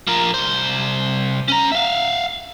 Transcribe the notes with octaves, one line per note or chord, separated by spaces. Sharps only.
F3 A#4
C2 C5
C#4 A#5
E5 F5